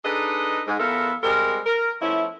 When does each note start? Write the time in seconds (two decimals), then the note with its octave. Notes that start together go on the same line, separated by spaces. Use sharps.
0.05 D4 D#4 G#4 A4 B4 D#5
0.67 G#2
0.80 E2 B3 F4 A4 A#4 E5
1.23 G3 G#3 C4 A#4
1.66 A#4
2.02 F3 A3 B3 C#4 E4